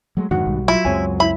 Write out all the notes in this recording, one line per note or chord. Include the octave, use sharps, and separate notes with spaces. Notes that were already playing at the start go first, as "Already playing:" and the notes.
F#3 G#3 A3
F2 G#2 D3 D#3 F#4 F#5
B1 G3
F#3 E4 F4
C#2 F#2 G#3 C4 C#5 G#5
E4 E5 B5